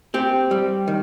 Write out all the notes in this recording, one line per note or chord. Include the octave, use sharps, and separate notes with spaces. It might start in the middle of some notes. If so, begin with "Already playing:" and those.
C4 G4
G3
D#3